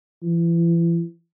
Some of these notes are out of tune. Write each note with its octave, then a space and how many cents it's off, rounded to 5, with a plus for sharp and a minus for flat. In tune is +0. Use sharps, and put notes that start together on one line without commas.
E3 +35